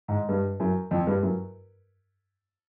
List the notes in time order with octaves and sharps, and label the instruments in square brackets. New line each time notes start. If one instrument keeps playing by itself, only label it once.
[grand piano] G#2
G2
F#2
F2
G2
F#2